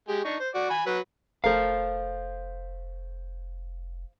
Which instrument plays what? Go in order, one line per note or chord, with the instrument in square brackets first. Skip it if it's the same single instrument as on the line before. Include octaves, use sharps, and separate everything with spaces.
[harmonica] G#3 G4
D4 D#4 C#6
C5
F#4 D5
G#5 B5
F#3 B4
[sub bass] F1 [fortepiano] A3 A#4 [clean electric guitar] C5 F5